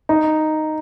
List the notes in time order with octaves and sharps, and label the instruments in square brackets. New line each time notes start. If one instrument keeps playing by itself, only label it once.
[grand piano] D#4